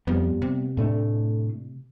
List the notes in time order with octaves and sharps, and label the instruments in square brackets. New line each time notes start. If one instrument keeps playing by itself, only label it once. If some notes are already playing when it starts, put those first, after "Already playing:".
[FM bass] F2 [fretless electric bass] G3 B3
[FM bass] C3
[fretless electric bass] A2 A3 D4